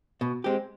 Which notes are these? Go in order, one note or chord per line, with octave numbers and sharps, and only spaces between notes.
B2
G#3 C4 G4